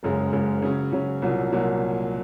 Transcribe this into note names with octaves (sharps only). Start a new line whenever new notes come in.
F#1 F#2 C#3 G#3
F#1 F#2 C#3 G#3
C#3 F#3 C#4
C#3 F#3 C#4
C2 A#2 F#3 A#3
C2 A#2 F#3 A#3